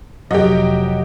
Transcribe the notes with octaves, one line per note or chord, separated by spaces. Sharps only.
F1 F#3 G4 D#5